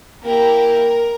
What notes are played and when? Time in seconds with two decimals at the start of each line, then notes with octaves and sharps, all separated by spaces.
0.23 A#3 E4 G4 A#4